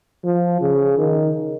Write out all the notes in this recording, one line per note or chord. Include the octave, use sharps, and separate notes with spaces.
F3
C#3
D#3